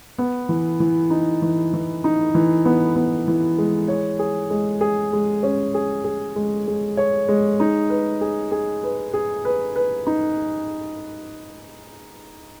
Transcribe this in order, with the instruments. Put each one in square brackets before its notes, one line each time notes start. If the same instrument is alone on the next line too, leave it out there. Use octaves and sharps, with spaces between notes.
[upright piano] B3
E3
E3
D#4
E3
E3
D#4
E3
B3
B3
E3
G#3
C#5
G#4
G#3
G#4
G#3
C#4
G#4
G#4
G#3
G#3
C#5
G#3
D#4
B4
G#4
G#4
B4
G#4
B4
B4
D#4